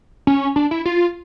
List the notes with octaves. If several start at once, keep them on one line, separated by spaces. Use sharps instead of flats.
C#4
D4
E4
F4